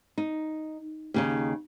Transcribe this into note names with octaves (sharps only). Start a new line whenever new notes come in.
D#4
D#2 C#3 D#4